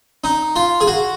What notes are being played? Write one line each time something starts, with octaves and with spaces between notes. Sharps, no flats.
D#4
F4
G#4
F#4